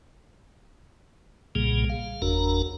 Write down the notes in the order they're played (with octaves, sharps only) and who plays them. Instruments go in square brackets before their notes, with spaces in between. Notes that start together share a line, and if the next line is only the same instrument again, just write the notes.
[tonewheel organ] B1 A#2 C#3 G3 A#3 G#4
F5
F#1 E2 D4 F#4 A#4 A#5